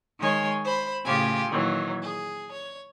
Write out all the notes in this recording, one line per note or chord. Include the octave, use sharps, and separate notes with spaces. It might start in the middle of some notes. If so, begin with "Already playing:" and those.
D#3 G#3 C#5 G#5 C6
C5 B5
A2 C#3 F4 G4 G#5
A#2 D#3 E3 F#3
G#4
C#5